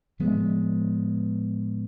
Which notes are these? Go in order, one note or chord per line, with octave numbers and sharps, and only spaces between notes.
A2 F3 G#3 B3